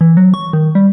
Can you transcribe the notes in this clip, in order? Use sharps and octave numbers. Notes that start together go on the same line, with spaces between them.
E3
F#3
C#6
D#3
G3